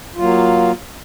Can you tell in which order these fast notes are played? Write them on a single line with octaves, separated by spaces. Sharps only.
F4 F#3 A#3